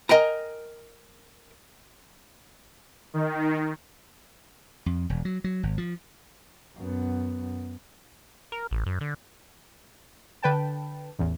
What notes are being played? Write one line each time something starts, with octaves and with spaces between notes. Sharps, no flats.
A#4 D#5 G5 G#5 A#5
D#3
F2
E1
F#3
F#3
G#1
F3
F#2 B3
A#4
A1
F#2
D3
D3 B4 G5 A5
A1 E2